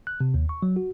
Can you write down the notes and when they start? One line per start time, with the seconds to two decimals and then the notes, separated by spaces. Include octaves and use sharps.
0.07 F#6
0.21 C3
0.34 D#2
0.49 C#6
0.62 F#3
0.76 F#4